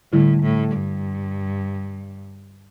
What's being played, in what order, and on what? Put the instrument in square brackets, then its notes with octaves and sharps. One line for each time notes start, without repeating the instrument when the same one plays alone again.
[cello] A2 [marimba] D3 G3 E4
[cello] A2
G2